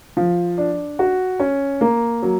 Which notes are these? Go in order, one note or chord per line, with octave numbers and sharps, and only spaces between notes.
F3
D4
F#4
C#4
A#3
F#3